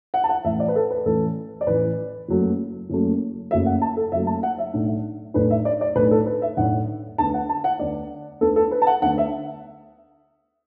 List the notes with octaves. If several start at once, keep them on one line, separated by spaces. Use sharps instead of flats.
F#5
A5
F#5
A1 A2 E3 E5
D5
B4
A4
B4
A1 A2 E3 A4
D5
A1 A2 E3 B4
F#1 F#2 F#3 A3
F#1 F#2 F#3 A3
F#1 F#2 F#3 A3 E5
F#5
A5
A4
F#1 F#2 F#3 A3 E5
A5
F#5
E5
B1 A2 A3 D4
B1 A2 A3 D4 B4
E5
D5
D5
B1 A2 A3 D4 B4
A4
B4
E5
B1 A2 A3 D4 F#5
D2 D3 B3 A5
F#5
A5
F#5
D2 D3 B3 D5
D2 D3 B3 A4
A4
B4
A5
F#5
D2 D3 B3 F#5
E5